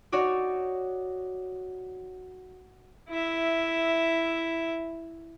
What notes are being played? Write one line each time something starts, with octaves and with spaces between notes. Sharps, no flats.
D#4 F#4 C#5 D5
E4 E5